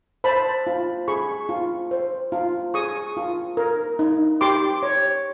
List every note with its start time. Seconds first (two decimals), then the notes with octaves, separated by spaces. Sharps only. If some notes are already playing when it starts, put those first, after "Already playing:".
0.24 C5 A5 B5
0.67 F4
1.08 G#4 B5 C#6
1.49 F4
1.91 C5
2.32 F4
2.74 G#4 C#6 D#6
3.17 F4
3.57 A#4
3.99 D#4
4.41 G4 C6 D6
4.83 C#5